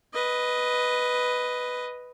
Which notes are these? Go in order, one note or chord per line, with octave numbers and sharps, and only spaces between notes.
B4 D#5